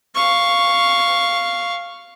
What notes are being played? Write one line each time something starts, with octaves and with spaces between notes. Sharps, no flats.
F5 C#6